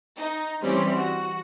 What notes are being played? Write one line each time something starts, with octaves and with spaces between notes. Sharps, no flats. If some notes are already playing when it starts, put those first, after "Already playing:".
D#4
E3 G3 C4 C#4
F#4